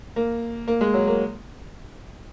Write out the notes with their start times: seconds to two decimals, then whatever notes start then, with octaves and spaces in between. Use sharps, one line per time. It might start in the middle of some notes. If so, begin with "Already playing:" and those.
0.16 A#3
0.68 A#3
0.81 G#3
0.94 F#3
1.07 A#3